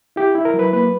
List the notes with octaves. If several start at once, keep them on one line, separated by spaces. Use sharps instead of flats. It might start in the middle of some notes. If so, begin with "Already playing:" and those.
E4 G4
E4
A#4
F#3
B4
A#3 B4